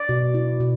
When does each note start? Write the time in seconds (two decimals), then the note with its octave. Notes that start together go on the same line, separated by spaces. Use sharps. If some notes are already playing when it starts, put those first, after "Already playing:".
Already playing: D5
0.09 B2
0.34 E4
0.60 B2